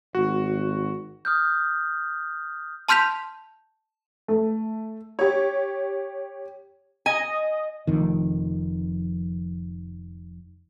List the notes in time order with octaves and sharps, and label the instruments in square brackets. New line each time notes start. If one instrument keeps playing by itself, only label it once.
[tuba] G#1 [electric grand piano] F#4
[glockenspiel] D#6 F6 G6
[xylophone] A5 C6 F6 G6 B6 F7
[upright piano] A3
[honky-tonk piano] G4 C#5
[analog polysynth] D#5 [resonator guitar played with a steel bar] G#5
[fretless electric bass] F1 F2 D#3